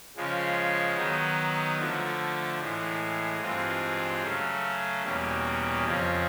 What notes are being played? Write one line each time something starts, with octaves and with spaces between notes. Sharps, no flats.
C#3 F3 G#3
D#3 F#3 B3 D#4
D3 F3 A3
A2 E3 G#3
G2 E3 G#3 C4 F4
C#3 F#3 A3 C#4
E2 B2 G3 A#3 C#4
F2 C#3 F3